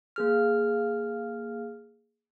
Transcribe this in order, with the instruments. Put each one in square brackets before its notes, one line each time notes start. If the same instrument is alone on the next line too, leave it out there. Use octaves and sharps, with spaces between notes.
[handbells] A#3 G#4 F6